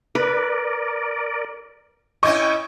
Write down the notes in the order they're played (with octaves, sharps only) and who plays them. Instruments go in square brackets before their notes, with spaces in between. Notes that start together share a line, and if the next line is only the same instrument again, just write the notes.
[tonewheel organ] A#4 D5 [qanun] B4
[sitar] C#4 E4 D#5 [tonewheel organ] G5 G#5 [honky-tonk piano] C#6